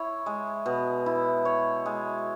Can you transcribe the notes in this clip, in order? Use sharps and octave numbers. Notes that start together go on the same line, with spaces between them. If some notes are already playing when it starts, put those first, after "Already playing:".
Already playing: E4 C#5
G#3
B2
E4
C#5
G#3